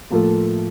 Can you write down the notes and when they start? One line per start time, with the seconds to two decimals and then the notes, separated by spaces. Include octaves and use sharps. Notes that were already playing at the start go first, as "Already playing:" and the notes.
0.10 A2 F3 A#3 F4 A4